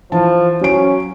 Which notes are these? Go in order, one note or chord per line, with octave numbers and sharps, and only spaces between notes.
E3 F3 A5
F#3 C#4 D7